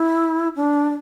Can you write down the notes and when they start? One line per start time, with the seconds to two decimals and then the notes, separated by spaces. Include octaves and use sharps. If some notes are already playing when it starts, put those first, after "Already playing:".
Already playing: E4
0.56 D4